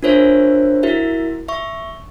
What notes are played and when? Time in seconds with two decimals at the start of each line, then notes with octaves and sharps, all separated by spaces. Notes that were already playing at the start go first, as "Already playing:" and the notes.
0.03 D4 F4 A#4 C5 C#5 E5
0.83 E4 F#4 A#4 E5
1.48 E5 C#6